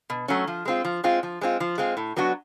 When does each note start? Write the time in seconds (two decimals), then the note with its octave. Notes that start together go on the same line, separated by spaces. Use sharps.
0.10 B2
0.28 F#3 A3 C#4
0.47 F3
0.65 G#3 C4 F4
0.85 F3
1.04 G#3 C4 F4
1.23 F3
1.41 G#3 C4 F4
1.60 F3
1.78 G#3 C4 F4
1.97 A2
2.16 F#3 B3 D4 F#4